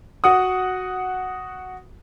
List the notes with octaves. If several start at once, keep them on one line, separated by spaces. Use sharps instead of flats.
F#4 F#5 D#6